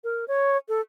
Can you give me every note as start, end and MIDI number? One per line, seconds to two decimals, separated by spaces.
0.04 0.25 70
0.28 0.57 73
0.68 0.81 69